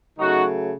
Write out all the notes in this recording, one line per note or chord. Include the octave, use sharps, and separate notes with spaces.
C#3 F#3 A3 D#4 F#4